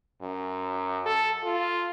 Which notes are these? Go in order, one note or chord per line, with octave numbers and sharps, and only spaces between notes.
F#2
A4
F4